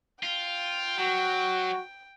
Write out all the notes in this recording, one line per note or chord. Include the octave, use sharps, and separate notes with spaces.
F4 G5
F#3 F#4